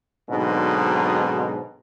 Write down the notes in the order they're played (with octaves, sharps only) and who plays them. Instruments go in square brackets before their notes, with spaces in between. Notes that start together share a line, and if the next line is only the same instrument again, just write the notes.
[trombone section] G#2 B2 D3 F#3 C4 D#4